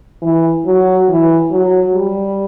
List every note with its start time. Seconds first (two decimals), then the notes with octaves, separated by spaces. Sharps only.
0.22 E3
0.66 F#3
1.08 E3
1.51 F#3
1.93 G3